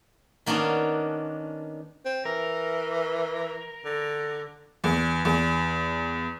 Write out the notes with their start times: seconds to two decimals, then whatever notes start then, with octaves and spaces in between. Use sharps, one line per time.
0.46 D#3 A#3 B3 C#4 D4
2.05 C4
2.25 E3 A#4
3.85 D3
4.84 E2
5.25 E2